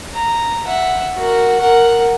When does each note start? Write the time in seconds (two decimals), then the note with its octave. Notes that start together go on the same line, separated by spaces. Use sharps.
0.13 A#5
0.66 E5 F#5
1.16 F#4 A#4
1.61 A#4 F#5